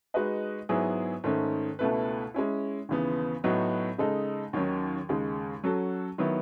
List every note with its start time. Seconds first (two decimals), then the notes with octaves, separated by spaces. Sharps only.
0.14 G#3 D#4 F#4 B4 D#5
0.69 G#2 F#3 B3 E4 G#4
1.24 G#2 D#3 A3 C#4
1.79 C#2 B2 A3 E4 B4
2.34 G#3 C#4 E4
2.89 D#2 C#3 E3 B3
3.44 A2 F#3 B3 D#4 F#4
3.98 C#3 G#3 D#4 A4
4.53 D#2 D#3 F#3 C#4
5.09 D#2 C#3 G#3
5.64 F#3 C#4 F#4 A4
6.18 D#3 F#3 B3 E4